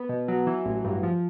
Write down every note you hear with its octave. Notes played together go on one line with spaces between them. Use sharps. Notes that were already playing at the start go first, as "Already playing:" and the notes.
Already playing: B3
B2
F#3
E3
A1
G2
F3